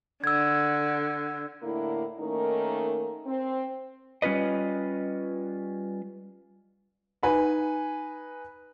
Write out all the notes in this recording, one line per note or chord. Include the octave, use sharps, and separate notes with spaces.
D3 E6 G#6
A2 D3 A#3 E4
D#3 A3 A#3 C#4 D#4 A#4
C4
G3 C#4 F4 B4 D#5
D#4 B4 G#5